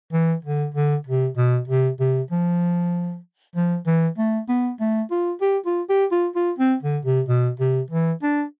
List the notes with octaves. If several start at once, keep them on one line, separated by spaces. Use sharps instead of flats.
E3
D3
D3
C3
B2
C3
C3
F3
F3
E3
A3
B3
A3
F4
G4
F4
G4
F4
F4
C4
D3
C3
B2
C3
E3
D4